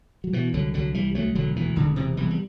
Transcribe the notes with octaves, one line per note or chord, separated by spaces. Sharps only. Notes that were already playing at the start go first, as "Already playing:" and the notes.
F#3
B2 E3
C2 D3 F#3
C2 D3 F#3
C2 E3 G3
D2 F#3 A3
E1 D3 F#3
D2 E3
E1 D3
C3 E3
E1 E3 G3
G3